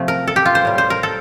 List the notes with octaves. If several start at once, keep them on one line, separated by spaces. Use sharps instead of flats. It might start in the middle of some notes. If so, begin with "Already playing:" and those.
Already playing: C3 F3 A3
A#4
A4
G4
F4
C5
A2 G3
C5
A#4
A4